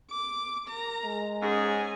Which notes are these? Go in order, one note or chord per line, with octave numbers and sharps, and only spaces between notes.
D6
A#4 A#5
G#3
G#2 C#4 G#4 G#5